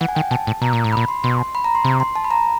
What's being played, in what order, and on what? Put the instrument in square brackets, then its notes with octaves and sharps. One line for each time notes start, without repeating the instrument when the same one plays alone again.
[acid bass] E3 [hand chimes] F#5
[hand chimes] G#5
[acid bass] D#3 [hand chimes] G5
[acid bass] B2 [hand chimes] A5
[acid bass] A2
[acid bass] B2 [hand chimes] A#5
[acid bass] A#2
A2
[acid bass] A#2 [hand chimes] B5
[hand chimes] C6
[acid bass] B2 [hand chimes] C6
[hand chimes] B5
A#5
C6
[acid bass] C3
[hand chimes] C6
A5
B5
A#5